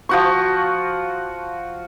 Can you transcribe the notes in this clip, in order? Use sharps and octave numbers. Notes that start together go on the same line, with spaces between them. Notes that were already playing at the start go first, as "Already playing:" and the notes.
F3 F#4 C#6